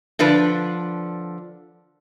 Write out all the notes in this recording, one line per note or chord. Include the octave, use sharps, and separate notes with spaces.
D3 F3 D4 B4